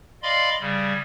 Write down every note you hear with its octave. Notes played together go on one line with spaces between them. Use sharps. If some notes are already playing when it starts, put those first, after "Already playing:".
D5 D#5 F5 B5 C6
C#3 G3